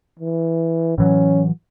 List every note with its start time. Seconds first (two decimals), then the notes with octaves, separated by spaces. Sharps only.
0.19 E3
0.98 A2 E3 F#3 C#4